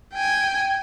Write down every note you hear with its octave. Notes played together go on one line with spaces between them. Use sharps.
G5 G#5